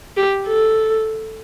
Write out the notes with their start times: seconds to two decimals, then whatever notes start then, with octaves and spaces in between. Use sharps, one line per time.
0.17 G4
0.48 A4